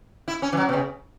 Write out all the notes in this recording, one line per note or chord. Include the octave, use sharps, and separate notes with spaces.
E4
C#4
E3
F#3
B2
C#3